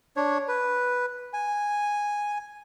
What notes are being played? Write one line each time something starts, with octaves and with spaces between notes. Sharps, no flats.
D4 C#5
B4
G#5